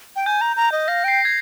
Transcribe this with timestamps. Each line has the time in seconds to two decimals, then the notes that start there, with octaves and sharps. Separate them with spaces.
0.16 G5
0.26 G#5 G6
0.41 A#5
0.56 A#5
0.72 D#5
0.88 F5 A#6
1.04 G5 C7
1.25 G#6